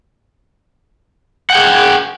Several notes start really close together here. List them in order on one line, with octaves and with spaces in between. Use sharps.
F#5 G5 G#4